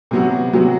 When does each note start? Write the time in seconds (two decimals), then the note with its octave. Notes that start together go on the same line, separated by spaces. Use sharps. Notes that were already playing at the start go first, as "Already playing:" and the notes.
0.11 C3 F#3 B3 F#4
0.53 C3 F#3 B3 F#4